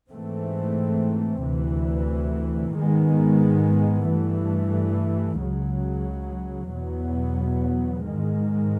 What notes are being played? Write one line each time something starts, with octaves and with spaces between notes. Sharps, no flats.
G#2 E3 A3 C4
D2 C3 E3
G#2 D#3 G#3 B3
G2 E3 A3
C#2 C#3 F#3
E2 B2 F#3 B3
G#2 D#3 G#3